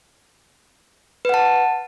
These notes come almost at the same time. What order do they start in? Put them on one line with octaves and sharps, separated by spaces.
B4 F#5 A5